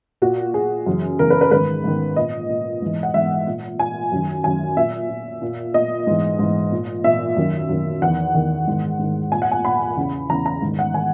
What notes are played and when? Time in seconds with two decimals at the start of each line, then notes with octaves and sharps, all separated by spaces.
0.22 A#2 F#4
0.54 A#2 G#4
0.86 F#2 C#3 E3
1.19 F#2 C#3 E3 A#4
1.30 B4
1.41 B4
1.51 G#2 D#3 B4
1.84 G#2 D#3
2.16 A#2 D#5
2.49 A#2
2.82 G#2 E3
3.03 F#5
3.14 G#2 E3 E5
3.47 A#2
3.79 A#2 G#5
4.12 F#2 D#3
4.44 F#2 D#3 G#5
4.77 A#2 E5
5.09 A#2
5.42 A#2
5.74 A#2 D#5
6.07 G#2 E3
6.39 G#2 E3
6.72 A#2
7.04 A#2 E5
7.37 F#2 D#3
7.69 F#2 D#3
8.02 E2 D#3 F#5
8.34 E2 D#3
8.67 G#2 D#3
8.99 G#2 D#3
9.32 A#2 G#5
9.42 F#5
9.51 G#5
9.65 A#2 B5
9.97 E2 C#3 E3
10.30 E2 C#3 E3 A#5
10.46 A#5
10.62 G#2 D#3
10.79 F#5
10.94 D#3 G#5